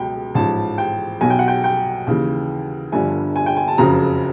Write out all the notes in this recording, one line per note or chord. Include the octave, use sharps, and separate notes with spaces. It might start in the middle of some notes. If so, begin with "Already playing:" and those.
Already playing: C#2 B2 F#3 G5
A1 G#2 F3 A5
G5
B1 B2 F#3 G#5
G5
F#5
G5
G5
D#2 C#3 E3
G1 G2 D3 F3 G#5
G#5
G5
G#5
A5
F#1 F2 C#3 F#3 A#5